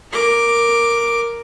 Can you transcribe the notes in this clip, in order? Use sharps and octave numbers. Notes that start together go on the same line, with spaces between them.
A#4 D6